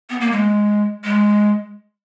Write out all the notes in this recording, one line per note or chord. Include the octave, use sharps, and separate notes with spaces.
B3
A#3
G#3
G#3